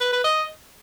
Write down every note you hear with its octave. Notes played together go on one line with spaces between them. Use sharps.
B4
B4
D#5